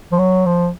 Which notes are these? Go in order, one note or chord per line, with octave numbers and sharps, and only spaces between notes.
F3
F#3
F3